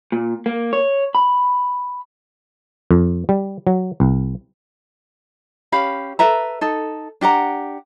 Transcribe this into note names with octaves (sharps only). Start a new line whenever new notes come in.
A#2
A#3
C#5
B5
F2
G3
F#3
C2
C#4 G4 F5 B5
A4 B4 E5 A#5
D#4 A4
D4 G4 F#5 A#5